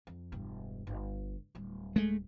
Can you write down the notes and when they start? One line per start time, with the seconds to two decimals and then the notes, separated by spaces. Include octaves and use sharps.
0.07 F2
0.32 E1 G2
0.87 G1
1.55 D1 G3
1.96 G#3 A3